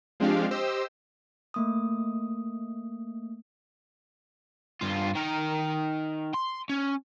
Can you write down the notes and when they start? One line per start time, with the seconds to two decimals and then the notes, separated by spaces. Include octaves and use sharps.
0.20 F3 G#3 C4 D4 G4 F5
0.51 G4 C5 D#5 E6
1.54 A3 A#3 D#6
4.81 G2 F4
5.15 D#3 A#4
6.34 C6
6.70 C#4